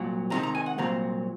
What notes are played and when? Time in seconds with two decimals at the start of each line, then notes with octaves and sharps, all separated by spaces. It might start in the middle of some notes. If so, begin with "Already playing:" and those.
Already playing: C2 A#2 F#3
0.30 C#2 C3 D#3 G#3 A#5
0.43 A#5
0.55 G#5
0.66 F#5
0.78 C2 A#2 F#3 C4 A#5